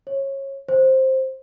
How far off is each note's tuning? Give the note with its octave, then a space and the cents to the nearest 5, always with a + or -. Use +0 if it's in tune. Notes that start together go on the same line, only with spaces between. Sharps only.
C#5 -25
C5 +10